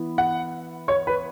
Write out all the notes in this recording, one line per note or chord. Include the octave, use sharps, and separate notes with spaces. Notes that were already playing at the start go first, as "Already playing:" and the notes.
Already playing: E3 B3 E4
F#5
C#5
B4